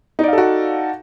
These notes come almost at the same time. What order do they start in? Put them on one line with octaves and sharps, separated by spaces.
D#4 D5 F5 A4 F#4